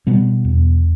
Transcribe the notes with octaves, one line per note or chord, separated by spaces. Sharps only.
B2 G3 B3
E2